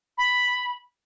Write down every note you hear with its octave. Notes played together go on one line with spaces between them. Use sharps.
B5